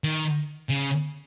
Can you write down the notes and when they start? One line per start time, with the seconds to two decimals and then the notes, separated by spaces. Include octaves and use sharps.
0.04 D#3
0.70 C#3